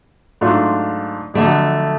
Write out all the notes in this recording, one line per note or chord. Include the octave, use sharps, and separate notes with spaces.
G#2 F#3 A3 D4 F4
F2 D3 F#3 A3